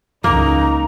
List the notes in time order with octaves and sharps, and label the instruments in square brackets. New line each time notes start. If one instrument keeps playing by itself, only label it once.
[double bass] C#2 [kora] A#3 [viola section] D#4 [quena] A#5